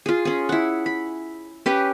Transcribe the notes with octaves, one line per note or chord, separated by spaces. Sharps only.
F4 G#4
C#4 G#4
E4 F#5
B5
C#4 G4 B4